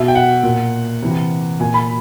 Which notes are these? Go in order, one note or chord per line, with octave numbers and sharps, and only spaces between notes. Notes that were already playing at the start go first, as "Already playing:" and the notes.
Already playing: B2 E5
G5
F#5
A#2
C3 E3
A#2 G#5
B5